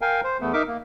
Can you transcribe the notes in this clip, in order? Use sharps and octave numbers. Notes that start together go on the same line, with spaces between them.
A#4 F5 G5 G#5
C5
E2 A3 B3
D#4 A#4 E5 D6
A#3